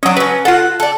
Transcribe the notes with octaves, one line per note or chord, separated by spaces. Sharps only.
F#3 C#4 D4 D#5
F#3 C#4 B4
F4 F#4 A4 F#5
A4 D5